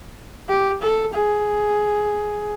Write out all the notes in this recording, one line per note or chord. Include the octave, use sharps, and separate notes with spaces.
G4
A4
G#4